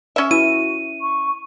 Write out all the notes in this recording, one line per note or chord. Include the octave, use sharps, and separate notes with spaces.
C#4 E5
E4 F#4 D#7
C#6